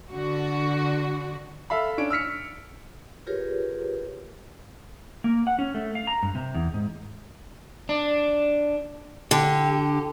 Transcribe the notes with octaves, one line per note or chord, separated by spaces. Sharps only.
D3 F#4
A4 E5 F5 B5
C#4 D4 D7
E6 F6 B6 C#7
F4 G4 G#4 A#4 B4 C#5
A#3
F#5
C#4
A3
F5
A#5
G2
C3
E2
G#2
D4
D3 G4